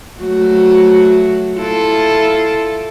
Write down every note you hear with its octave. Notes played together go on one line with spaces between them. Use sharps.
F#3 A3 F#4
E4 F4 A4